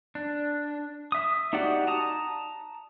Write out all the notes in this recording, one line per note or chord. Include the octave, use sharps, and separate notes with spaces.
D4
E5 D#6
D#4 F#4 G4 D5 F#5
A5 A#5 D#6